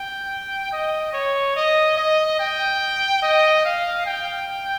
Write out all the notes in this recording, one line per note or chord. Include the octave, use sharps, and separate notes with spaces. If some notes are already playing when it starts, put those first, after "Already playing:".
Already playing: G5
D#5
C#5
D#5
D#5
G5
D#5
F5
G5